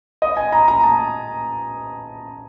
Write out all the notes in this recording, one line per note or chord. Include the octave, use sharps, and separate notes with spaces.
D#5
G#5
A#5
A#5
A5